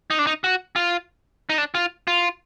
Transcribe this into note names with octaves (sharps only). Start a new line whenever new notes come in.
D#4
D4
D#4
F#4
F4
D#4
D4
F4
F4